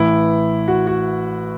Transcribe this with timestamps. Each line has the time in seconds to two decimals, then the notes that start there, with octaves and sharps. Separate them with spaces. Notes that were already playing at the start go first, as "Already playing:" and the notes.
Already playing: A1 A2 E3 E4
0.68 F#4
0.87 F#4